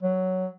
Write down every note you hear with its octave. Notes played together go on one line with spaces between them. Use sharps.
F#3